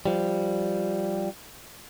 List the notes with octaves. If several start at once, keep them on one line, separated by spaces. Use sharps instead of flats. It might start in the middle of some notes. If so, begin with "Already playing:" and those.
F3 G3